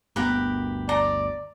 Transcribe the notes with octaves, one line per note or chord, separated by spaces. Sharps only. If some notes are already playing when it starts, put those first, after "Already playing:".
G1 D2 B3 G4 A#4 B4
D5 A#5